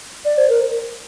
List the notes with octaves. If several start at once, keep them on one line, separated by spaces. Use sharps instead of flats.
D5
C5
A#4